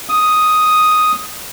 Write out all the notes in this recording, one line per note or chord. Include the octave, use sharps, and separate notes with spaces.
D#6